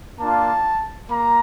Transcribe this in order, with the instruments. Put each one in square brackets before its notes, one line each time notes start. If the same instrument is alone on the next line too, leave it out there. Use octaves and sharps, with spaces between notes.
[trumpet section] A#3 D4 F4 A5
A#3 A#5